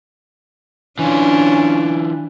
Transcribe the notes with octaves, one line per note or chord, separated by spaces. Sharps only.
E3 C#4 D4 F4